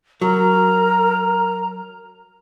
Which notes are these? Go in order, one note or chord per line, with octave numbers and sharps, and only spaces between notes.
F#3 A#4 A#5